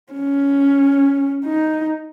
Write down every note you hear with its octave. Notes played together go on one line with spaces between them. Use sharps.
C#4
D#4